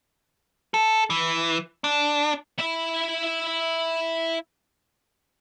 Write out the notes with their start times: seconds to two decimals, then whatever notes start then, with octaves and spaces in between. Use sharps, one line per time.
0.74 A4
1.10 E3
1.84 D4
2.59 E4 E5